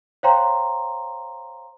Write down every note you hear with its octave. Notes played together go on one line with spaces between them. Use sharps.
C5 C#5 F5 G5 A#5 C6